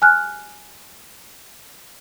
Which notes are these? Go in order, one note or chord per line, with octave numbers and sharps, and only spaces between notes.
G#5 F6 F#6